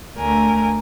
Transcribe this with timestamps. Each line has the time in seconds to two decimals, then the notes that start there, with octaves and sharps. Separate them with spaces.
0.17 D2 A3 A#4 G#5